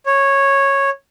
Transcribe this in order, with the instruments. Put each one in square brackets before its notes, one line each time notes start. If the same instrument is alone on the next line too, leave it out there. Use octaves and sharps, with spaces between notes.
[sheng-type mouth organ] C#5